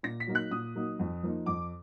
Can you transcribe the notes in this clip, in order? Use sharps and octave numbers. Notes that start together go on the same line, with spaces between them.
A#2 A#6
B6
F#3 A#3 D#4
F#6
A#2 D#6
F#3 A#3 D#4
F2
F3 A#3 D#4
F2 D6